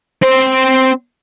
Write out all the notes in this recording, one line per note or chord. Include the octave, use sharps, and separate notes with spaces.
C4 C5